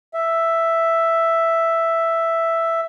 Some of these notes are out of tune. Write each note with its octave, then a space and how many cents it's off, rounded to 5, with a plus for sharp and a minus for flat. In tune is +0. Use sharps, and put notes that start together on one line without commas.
E5 +5